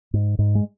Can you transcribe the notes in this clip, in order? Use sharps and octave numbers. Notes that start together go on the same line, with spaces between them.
G#2
G#2
G#3